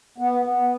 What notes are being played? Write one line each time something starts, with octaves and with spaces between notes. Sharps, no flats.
B3
B3